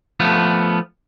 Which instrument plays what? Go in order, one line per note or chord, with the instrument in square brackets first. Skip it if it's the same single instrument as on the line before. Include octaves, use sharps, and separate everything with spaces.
[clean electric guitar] F3 A3 B3